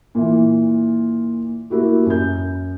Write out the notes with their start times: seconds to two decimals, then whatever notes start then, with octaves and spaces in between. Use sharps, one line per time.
0.15 A#2 E3
1.70 A#3 E4 F#4 G4
2.06 F#2 G6